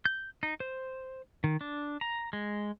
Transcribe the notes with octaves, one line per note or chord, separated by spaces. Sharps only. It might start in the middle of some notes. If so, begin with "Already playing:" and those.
G6
D#4
C5
D#3
D4
A#5
G#3